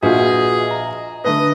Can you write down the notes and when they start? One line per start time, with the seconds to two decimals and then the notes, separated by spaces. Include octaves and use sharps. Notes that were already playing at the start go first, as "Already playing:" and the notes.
0.03 A#1 F4 F#4 G#4 B4 D#5 F#5
0.71 A#5
1.25 D3 A3 B4 D#5